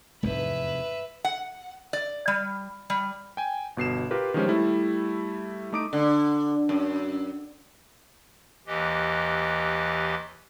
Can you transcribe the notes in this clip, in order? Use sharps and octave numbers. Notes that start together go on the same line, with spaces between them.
F1 E2 G#2 D#4 B4 E5
F#5
D5
G3
G3
G5 G#5
G1 B2 C7 E7
F4 G4 A#4 B4
D#3 F3 G#3 C#4 G4 C5
G3 A3 E4
A3 D#4 D6 D#6 D7
D3
F#2
D#2 E3 G4 D#5